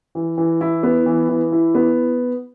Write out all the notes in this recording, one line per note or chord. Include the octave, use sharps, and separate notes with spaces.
E3
E3
E4
B3
E3
E3
E4
B3